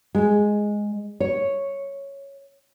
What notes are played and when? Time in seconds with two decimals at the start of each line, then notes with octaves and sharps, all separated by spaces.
0.15 G#3
1.20 C#5